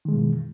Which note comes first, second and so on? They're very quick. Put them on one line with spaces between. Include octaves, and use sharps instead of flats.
D#3 G#3 B2 F#2 E3